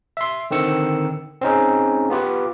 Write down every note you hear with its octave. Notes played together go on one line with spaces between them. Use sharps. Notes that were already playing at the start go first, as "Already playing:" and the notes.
E5 C6
D3 D#3 C4 E6 C#7
C4 C#4 D#4 G#4
B3 F4 G4 B4